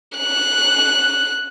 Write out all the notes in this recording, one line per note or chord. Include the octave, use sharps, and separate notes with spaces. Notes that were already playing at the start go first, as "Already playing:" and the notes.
F#6